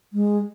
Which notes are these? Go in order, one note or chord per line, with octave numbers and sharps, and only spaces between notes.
G#3